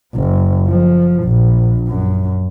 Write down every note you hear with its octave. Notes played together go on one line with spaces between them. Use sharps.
F#1
F3
A#1
F#2